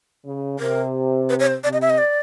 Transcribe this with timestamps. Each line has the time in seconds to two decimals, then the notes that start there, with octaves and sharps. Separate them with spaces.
0.25 C#3
0.59 C3 A#4
1.29 B4
1.40 C#5
1.47 C5
1.64 C3 D5
1.73 D#5
1.82 E5
1.90 D#5
1.98 D5